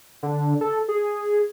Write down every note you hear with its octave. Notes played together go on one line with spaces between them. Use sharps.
D3
A4
G#4